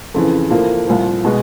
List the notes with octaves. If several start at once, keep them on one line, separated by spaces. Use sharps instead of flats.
F2 C#3 E3
A2 F3 A#3
C2 A#2 F3
B2 G#3